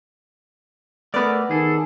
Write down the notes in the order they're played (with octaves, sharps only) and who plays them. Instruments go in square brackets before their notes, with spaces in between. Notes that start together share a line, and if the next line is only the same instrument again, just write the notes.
[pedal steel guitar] A3 A#4 D6 [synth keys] B3 D5
[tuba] D#3 [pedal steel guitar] G#4 A4